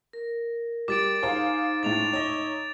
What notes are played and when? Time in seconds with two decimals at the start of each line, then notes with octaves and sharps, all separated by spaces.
0.13 A#4
0.88 G3 D6 A6 D7
1.23 D#4 G#4 C5 F5 A#5
1.83 A2 G#3 A6 F7
2.13 C#5 D#5